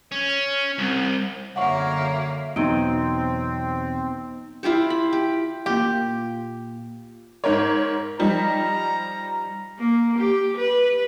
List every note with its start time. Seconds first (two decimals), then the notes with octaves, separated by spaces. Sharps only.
0.12 C#4
0.79 C2
1.56 F#2 D3 A#3 C#5 E5 F#5 C#6
2.56 E2 B2 F#3 B3 C4 D#4 D7
4.63 E4 F4 G4 C5
4.90 B5
5.13 G4
5.66 A#2 F4 G4
7.44 G#2 A#4 C#5
8.19 F3 G3 D#4 A#5
9.79 A#3
10.18 G4
10.57 B4